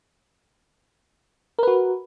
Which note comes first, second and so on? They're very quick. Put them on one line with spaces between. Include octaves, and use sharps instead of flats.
A#4 B4 F#4